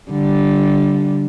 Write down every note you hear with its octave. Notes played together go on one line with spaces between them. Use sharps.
D3 G3